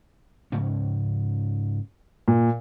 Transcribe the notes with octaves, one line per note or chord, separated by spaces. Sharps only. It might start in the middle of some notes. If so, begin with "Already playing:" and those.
G#2 C#3 C#4
A#2